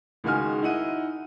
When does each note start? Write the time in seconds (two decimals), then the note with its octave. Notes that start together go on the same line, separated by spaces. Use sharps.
0.24 C#2 D#3 G#3 F#4 G#5 F6
0.62 D#4 E4 F#5 D#7